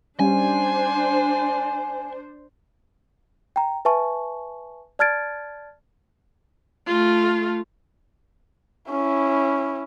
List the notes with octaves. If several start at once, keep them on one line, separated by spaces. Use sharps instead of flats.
G3 C#4 D4 C5 G#5
G5 A#5
B4 E5 G#5 A5 C#6
D5 A5 F6 G#6 A6 D7
A3 F4
C#4 E4